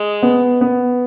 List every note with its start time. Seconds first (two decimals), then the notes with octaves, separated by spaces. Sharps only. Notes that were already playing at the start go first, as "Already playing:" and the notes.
Already playing: G#3
0.23 B3
0.61 B3